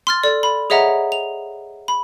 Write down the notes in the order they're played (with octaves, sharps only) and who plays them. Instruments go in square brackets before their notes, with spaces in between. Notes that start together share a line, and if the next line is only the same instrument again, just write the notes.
[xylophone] C6 F6 A6
A4 D5
B5
G#4 C#5 D#5 E5 F#5 A#5
F7
B5